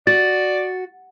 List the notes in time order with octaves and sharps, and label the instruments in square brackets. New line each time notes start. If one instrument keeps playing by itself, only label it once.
[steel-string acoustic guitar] F#4 [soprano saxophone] D5 [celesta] A6